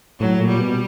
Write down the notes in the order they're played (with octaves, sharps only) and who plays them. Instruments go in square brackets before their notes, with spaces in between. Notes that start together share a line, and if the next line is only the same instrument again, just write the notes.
[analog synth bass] A2 [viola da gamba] F#3
[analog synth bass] A#2
[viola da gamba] G3
[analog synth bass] B2